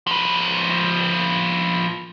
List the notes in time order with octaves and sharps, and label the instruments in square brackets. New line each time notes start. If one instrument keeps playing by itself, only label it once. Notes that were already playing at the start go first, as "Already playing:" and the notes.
[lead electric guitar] F3 B4